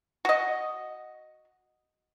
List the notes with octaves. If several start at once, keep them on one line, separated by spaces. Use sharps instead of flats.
F#4 D#5